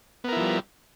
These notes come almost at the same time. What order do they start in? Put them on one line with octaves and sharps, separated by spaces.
B3 A#4 E4 F3 G3